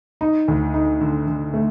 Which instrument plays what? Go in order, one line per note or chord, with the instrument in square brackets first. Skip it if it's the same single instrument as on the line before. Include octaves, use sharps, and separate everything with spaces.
[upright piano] D#4
D2
D#4
D3
D3
A3